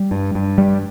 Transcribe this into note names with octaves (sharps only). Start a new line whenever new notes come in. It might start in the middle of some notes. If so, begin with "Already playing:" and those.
Already playing: G3
G2
G2
G3